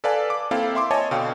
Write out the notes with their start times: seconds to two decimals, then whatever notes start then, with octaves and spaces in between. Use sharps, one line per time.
0.04 A4 B4 D5 F5 G#5 A5
0.30 D6
0.51 A#3 C4 E4 A4 F5
0.75 E5 C6 D6
0.91 C#5 D#5 G#5 A5
1.11 B2 D3 F5 G5